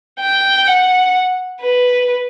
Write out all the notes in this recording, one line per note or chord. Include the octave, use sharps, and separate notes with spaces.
G5
F#5
B4